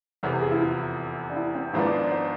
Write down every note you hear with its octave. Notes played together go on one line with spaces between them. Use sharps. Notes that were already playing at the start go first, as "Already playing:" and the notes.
F1 E2 C3
G#4
E4
F4
D4
E4
C4
G#1 G#2 F3 B3 D4 E4
D5
D5
C5